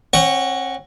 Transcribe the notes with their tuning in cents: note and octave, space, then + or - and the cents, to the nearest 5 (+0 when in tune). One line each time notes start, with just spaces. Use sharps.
C4 +40 C#5 +5 F#5 +0